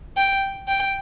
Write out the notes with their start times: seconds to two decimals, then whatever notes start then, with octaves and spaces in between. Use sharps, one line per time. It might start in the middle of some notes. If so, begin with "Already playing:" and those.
0.17 G5
0.68 G5